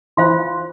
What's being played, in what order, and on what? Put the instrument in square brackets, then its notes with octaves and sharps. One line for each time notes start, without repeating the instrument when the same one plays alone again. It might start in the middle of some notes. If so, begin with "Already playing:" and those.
[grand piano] E3 [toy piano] F4 C5 F5 C6